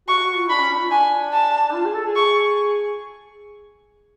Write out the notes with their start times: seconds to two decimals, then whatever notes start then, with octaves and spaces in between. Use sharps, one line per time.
0.08 F#4 C#6
0.23 F#4
0.36 F4
0.50 D4 B5
0.60 C#4
0.71 D4
0.81 F4
0.91 D4 G#5
1.33 A5
1.74 F4
1.85 G#4
1.95 A4
2.06 G#4
2.16 C#6